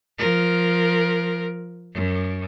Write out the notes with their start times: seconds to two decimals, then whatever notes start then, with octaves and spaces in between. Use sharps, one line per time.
0.18 F3 A#4
1.94 F#2